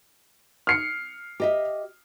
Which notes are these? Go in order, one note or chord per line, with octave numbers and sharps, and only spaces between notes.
F6 C7 C#7
G4 D#5 E5